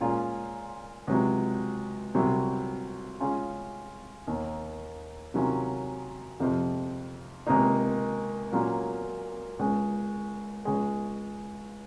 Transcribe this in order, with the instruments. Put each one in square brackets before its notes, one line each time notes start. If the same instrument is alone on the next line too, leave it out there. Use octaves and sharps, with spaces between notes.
[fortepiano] A#2 G#3 C#4 F4
C#2 C3 F#3
C2 C3 F#3
C#3 G#3 C#4 F4
D#2 D#3 A#3
C3 D#3 F#3 C#4 F4
F2 C3 F3
C#2 C3 D#3 A#3 D#4
A#2 F#3 A#3 C#4 F4
C#2 C#3 G#3
C#2 C#3 G#3